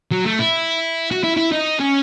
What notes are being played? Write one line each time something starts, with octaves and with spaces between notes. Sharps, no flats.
F#3
A3
E4
F#4
E4
E4
D#4
C#4